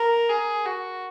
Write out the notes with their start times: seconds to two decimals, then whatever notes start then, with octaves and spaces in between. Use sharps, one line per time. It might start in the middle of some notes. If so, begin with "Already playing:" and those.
Already playing: A#4
0.29 G#4
0.65 F#4